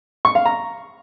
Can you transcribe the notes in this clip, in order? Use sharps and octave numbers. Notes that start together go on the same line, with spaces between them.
C#6
F5
A#5